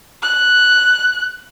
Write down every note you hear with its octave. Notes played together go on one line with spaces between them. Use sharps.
F#6